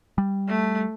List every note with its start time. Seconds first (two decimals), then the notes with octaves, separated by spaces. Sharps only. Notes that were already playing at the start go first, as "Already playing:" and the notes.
0.18 G3
0.48 A3